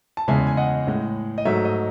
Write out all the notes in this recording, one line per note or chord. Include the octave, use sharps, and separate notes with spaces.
A5
E2 C#3 G#3 E5 G#5
G#5
D#5 F#5
A2 G#3
D#5
G#2 F#3 A3 E5
D#5